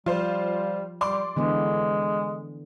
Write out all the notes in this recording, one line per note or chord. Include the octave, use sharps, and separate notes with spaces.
F3 G3 F4 C5
G3 D5 C6 D6
D3 E3 G#3 B3